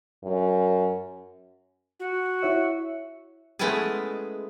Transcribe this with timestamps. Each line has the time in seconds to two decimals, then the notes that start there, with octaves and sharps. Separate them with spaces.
0.23 F#2
1.99 F#4
2.43 E4 C#5 E5
3.59 G#3 A3 B3 C#4 E4 G#4